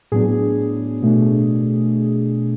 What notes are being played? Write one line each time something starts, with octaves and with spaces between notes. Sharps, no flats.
A2 F#3 B3 D4 G#4
B2 A3 D4